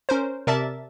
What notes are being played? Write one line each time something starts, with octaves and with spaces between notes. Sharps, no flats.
C#4 A#4 C5
C3 A#4 D5 E5 A5 A6